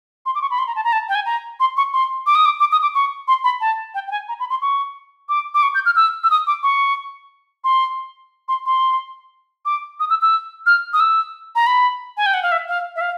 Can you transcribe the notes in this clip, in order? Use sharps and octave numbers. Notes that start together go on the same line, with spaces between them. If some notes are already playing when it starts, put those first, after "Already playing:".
C6
D6
C#6
B5
C6
A#5
A5
A#5
A5
G5
G#5
A#5
C6
C#6
C6
D6
D#6
D6
D6
D#6
D6
C#6
C6
B5
A5
G5
G5
G#5
A#5
B5
C6
C#6
D6
D6
C#6
G6
F6
E6
E6
D#6
D6
C#6
C6
C6
C6
D6
D#6
E6
E6
F6
D#6
E6
A#5
B5
G#5
G5
F#5
F5
E5
F5
E5
F5